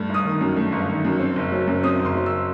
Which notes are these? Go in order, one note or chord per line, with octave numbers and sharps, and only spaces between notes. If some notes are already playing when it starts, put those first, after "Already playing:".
Already playing: G2 A3
G1
D#6
D#3
F#2
A3
G1
D#3
F#2
C4
F#1
F#3
F#2
C4 D#6
F#1
C6
F#3
E6